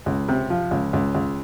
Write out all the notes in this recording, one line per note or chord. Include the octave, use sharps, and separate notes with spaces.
C#2
C3
F3
C#2
C#2
C#2